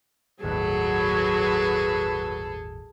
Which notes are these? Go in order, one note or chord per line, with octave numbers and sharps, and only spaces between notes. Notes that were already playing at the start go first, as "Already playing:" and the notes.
G1 D#2 A2 F#3 F#4 G#4 A4 B4